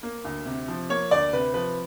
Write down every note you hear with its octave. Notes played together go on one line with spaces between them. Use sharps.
A#3
D2
C3
F3
A#3 C#5
D2 D5
C3 B4
F3 B4